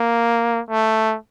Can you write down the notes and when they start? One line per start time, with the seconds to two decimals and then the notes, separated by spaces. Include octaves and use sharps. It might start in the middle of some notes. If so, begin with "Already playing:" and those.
Already playing: A#3
0.70 A3